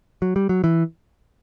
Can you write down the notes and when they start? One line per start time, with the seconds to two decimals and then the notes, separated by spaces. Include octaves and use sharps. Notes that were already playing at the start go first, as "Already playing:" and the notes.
0.22 F#3
0.36 G3
0.49 F#3
0.64 E3